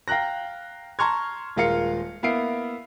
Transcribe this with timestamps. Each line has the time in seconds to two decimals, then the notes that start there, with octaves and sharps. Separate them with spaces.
0.08 F5 G5 A#5 F#6 A#6
0.99 A5 A#5 C6 C#6 F6 G#6
1.57 D#1 G#3 F4 A#4 F5 C#7
2.23 A#3 B3 E4 F5 C7 D7